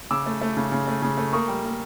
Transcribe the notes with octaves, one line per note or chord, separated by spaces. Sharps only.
C#3 D6 E6
A3
A3
C#3
C#3
A3
C#3
A3
A#3 C#6 D#6
G3
A#3